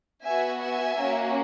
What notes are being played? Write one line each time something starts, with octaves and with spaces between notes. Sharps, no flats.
B3 F#4 E5 G#5
E5 G#5
A#3 C#4 F#4